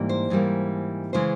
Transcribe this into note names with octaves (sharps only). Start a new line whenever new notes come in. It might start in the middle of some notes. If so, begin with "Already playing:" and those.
Already playing: G#2 E3 G3 A#3
C5
G#2 E3 G3 A#3
C#3 E3 G#3 C5